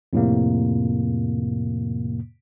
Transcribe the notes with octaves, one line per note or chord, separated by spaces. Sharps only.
F2 A2 C3 A#3